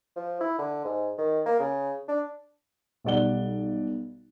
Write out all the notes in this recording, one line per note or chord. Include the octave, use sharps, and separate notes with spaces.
F3
E4
D3
G#2
D#3
A#3
C#3
D4
B1 G3 D5 F#5 G7